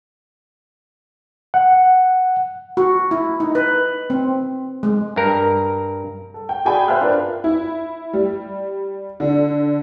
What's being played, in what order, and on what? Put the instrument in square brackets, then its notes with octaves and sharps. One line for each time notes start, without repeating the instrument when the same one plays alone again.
[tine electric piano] F#5
[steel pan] F#4
E4
D#4
B4
C4
G#3
[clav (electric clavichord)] G2 A#4
[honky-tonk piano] A4
G5
F#4 G#4 D5 G5 G#5 B5
C5 E5 F5 B5 F6 F#6
D4 F4 A#4 B4
E4
G3
D3